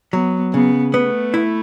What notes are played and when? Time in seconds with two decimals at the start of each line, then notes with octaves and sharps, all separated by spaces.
0.13 F#3 B3
0.54 C#3 B3
0.94 A3 B3
1.34 E4